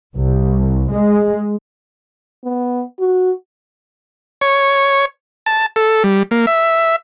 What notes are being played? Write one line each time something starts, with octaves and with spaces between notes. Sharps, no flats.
C2
G#3
B3
F#4
C#5
A5
A4
G3
A#3
E5